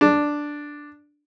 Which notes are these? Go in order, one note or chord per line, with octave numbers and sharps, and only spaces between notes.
D4